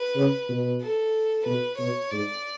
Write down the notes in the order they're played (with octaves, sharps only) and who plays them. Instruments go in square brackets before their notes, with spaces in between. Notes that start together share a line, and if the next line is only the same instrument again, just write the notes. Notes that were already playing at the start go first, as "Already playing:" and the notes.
Already playing: [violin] B4
[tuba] C#3
B2
[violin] A4
[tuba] B2 [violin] B4
[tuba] B2 [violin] C#5
[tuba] G#2 [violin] D5